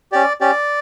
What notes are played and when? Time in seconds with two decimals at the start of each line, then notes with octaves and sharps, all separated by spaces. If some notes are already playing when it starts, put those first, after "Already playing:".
0.12 C#4 G4 D5
0.41 C#4 G4 D5